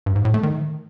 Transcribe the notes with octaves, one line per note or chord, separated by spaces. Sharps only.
G2
G#2
A2
A3
D#3